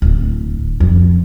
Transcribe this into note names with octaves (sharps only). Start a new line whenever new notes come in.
D1
F2